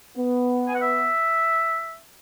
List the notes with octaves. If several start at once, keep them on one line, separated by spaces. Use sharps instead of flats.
B3
G#5
F#5
E5